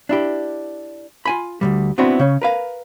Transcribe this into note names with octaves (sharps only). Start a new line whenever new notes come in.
D4 E4 G4
F4 G#5 B5
D2 A#2 G3
B3 C4 D4 E4 F#4
C#3 C#4
A#4 B4 F5